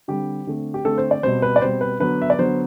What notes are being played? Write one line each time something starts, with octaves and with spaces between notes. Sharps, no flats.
D3 G3 C4 G4
D3 A3 C4
G4
D3 A3 C4 A4
C5
D5
B2 G3 C4 C5
B4
D5
B2 G3 C4 C5
B4
D3 F#3 B3 B4
E5
D5
D3 F#3 B3 C5